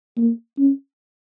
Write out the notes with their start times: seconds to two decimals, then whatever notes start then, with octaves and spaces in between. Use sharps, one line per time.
0.18 A#3
0.58 C#4